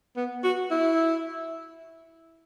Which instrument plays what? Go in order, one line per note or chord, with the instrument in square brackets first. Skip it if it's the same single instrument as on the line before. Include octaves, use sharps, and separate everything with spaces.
[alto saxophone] B3
F#4
E4